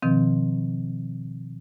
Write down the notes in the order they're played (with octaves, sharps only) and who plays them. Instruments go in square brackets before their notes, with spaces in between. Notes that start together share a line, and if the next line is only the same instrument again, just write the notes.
[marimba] B2 D#3 F3 C4